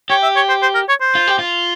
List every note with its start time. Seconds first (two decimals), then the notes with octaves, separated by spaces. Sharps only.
0.10 G4 C#5
0.23 E5
0.36 C#5
0.49 C5
0.62 C5
0.75 A#4
0.89 C#5
1.01 C5
1.15 F4
1.28 G4
1.39 F4